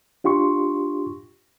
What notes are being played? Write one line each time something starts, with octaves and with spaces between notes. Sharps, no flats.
D4 F4 G4 C6 C#6